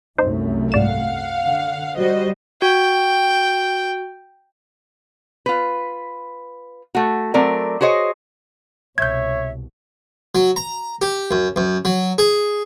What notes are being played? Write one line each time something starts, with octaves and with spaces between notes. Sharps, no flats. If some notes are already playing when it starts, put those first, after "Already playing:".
C2 F#2 A3 D#4 C5
G#2 D5 F5 F#5 E7
D3
G3 F#4 C5 D#5
F#4 G5
F4 B4
A3 F#4
F#3 A3 C4 A#4 D5
F#4 G#4 C5 C#5 D#5
C2 B2 C#5 E5 G6 G#6
F#3
A#5
G4
F#2
F#2
F#3
G#4